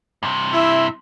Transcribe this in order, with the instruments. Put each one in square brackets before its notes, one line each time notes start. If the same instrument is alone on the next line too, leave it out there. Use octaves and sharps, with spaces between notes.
[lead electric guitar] G2 C3
[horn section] E4 E5